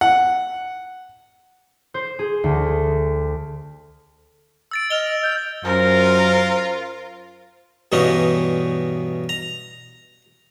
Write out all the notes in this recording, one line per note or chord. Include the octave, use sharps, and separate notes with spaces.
F#5
C5
G#4
D2
E6 A6 D7
D#5 F6 F7 G7
G6
F#2 F4 A#4 C5
G2 B2 E3 B3 C#4 D#4
A#5